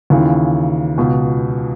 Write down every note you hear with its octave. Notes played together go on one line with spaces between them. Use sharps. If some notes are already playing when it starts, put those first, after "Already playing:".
D#2 C#3 E3 F4
C#2 B2